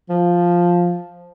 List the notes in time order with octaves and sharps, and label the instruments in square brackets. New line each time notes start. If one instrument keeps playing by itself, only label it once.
[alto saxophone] F3